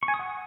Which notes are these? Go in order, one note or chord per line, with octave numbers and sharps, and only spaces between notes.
C#6
G#5
D#6
F#5